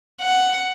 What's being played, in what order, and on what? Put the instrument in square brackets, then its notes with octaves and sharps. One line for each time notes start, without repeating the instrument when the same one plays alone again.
[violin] F#5